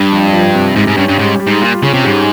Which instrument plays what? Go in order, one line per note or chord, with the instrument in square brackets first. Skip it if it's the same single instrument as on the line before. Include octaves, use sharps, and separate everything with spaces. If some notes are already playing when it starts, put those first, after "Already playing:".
Already playing: [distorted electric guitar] G2
[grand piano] F2
F3
C3
[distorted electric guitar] G#2 [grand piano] G3
[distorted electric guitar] G#2
[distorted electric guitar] G2 [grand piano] C#4
[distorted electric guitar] G2
[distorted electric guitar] G#2 [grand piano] G3
[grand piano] G3
[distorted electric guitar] G#2
[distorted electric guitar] A#2 [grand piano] F4
[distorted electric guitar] C#3 [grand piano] C#4
[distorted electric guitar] C3
[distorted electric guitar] G#2 [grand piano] G3